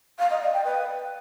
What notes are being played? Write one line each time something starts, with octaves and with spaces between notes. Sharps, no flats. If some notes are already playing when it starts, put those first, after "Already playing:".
F5
D#5
D5
G5
B4